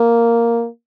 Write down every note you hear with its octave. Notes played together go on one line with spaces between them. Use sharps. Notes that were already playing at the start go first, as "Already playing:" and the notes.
Already playing: A#3